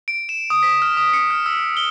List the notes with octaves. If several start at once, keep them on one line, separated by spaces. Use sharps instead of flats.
D7
E7
D#6
B6
F6
D#6
C#7
F6
E6
G7